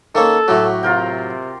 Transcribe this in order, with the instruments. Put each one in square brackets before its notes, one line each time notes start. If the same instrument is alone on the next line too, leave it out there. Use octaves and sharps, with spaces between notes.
[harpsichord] D#3 A#3 C#4 [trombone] A4
[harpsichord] A2 F#3 [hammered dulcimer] F#4 G4
[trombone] C3 [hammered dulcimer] F4 A#4 G5